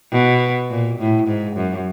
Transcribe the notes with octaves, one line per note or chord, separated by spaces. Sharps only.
B2
A#2
A2
G#2
F#2